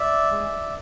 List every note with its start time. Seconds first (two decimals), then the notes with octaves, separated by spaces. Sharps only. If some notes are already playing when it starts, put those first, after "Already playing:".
Already playing: D5 E5
0.31 G#3